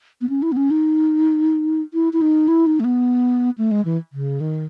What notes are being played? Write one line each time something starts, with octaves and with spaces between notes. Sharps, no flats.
B3
C#4
E4
B3
C#4
D#4
E4
E4
D#4
E4
D#4
A3
B3
A3
G#3
E3
C#3
D#3